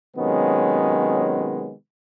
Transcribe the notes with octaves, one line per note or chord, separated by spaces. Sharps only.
C3 D#3 F#3 G#3 B3 C#4